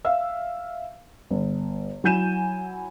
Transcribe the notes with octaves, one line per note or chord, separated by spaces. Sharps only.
E5 F5 E6
G1
F#3 E4 G#5 G6 D#7 E7